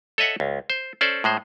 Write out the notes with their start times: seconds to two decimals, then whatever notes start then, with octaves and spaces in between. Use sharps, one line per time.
0.18 A4 C#5 D#5 E5 F#5
0.40 C#2
0.70 C5
1.01 C#4 A4 C5 D5
1.24 A2 G#3 C5